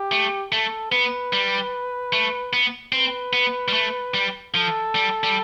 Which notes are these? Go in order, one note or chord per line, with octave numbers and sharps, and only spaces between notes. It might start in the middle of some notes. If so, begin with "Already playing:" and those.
Already playing: G4
A3
A3 A4
B3 B4
G3
A3
B3
C4 B4
B3
G3
A3
G3
F3 A4
G3
G3